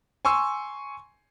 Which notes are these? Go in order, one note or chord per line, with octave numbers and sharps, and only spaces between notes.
G#5 C6 C#6 E6